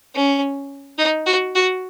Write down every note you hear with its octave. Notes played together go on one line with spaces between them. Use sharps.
C#4
D#4
F#4
F#4